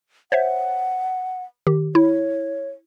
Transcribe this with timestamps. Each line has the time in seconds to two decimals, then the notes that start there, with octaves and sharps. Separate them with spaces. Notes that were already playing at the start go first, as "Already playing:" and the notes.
0.32 C5 C#5 E5 F#5
1.67 D#3 G4
1.95 E4 C#5